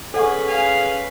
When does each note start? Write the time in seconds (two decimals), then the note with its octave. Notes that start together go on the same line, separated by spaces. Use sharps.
0.14 C#4 G#4 A4 B4 F#5 C#6
0.48 G#4 F5